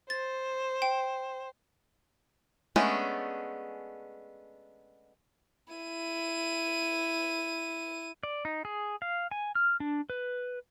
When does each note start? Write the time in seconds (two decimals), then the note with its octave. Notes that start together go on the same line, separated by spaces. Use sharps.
0.10 C5 A6
0.82 G5
2.76 G#3 A3 B3 C#4 D4
5.74 E4 D#7
8.23 D5
8.45 D#4
8.65 G#4
9.02 F5
9.31 G#5
9.55 F6
9.80 D4
10.10 B4